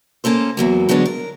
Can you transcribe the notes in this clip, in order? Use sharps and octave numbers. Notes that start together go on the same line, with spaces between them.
A#3 C#4 A4 C5
E2 F#3 A#3
D3 F#3 G#3 B3 C#4 D4
A#4